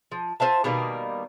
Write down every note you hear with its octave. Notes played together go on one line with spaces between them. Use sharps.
F3
F4 C5 E5 A5
B2 D#3 G3 A#3